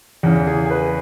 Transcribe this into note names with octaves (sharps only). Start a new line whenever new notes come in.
E2 C#3 E3
G#4
G#4
B4